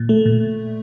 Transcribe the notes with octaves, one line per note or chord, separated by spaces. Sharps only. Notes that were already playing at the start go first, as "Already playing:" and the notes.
Already playing: A#2
A3
A#2